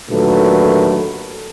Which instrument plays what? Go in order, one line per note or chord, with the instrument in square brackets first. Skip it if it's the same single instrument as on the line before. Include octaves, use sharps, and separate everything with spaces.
[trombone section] D#2 A#2 D3 F#3 A3 B4